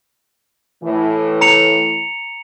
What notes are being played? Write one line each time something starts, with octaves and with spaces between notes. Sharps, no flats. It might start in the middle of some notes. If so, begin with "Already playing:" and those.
A2 E3
A#5 C#7 F7